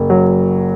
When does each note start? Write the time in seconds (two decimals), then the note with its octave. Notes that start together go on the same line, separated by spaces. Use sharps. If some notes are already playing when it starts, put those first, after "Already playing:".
Already playing: F#1
0.10 F#3